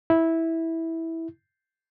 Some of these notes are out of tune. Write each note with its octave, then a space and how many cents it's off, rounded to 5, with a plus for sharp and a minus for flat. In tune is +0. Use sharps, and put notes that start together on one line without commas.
E4 -10